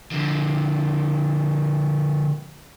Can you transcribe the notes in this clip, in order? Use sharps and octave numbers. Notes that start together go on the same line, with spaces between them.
D3 F3